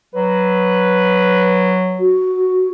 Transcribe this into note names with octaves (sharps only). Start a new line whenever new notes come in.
F#3 B4
F#4